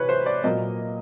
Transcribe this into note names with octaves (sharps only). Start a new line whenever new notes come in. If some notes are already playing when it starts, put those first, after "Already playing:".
Already playing: C3 E3 B4 C#5
C5
D5
A#2 F#3 A#3 D#5